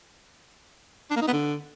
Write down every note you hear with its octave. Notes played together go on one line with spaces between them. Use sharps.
D4
A#3
D#4
B3
D3